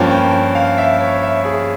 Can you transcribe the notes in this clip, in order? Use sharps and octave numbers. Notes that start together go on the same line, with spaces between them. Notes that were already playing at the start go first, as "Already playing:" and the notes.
Already playing: G2 F3 A#3 C#4 G5
G5
F5
E5
C#5
E5
G#4